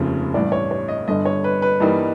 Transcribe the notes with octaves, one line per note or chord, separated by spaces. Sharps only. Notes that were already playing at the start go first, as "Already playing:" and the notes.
Already playing: F1 D#2 C#3 F3
A1 G2 E3 D5
C#5
C#5
D#5
G1 G2 D3 D#5
C#5
B4
B4
G2 E3 G3 A#3 D#4